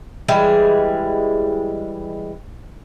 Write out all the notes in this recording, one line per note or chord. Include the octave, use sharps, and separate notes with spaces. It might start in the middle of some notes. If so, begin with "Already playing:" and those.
E3 G3 G#3 G#4